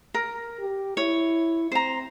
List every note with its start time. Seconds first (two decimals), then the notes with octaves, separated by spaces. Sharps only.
0.14 A#4
0.59 G4
0.97 E4 C#5
1.72 C4 C5 A#5